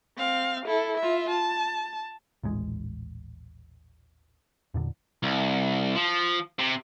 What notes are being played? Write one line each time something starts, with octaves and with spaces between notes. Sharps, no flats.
C4 F5
E4 A4
F4 E5
A5
D#1 A1 G#3
E2 A#2 D3
C2
F3
C3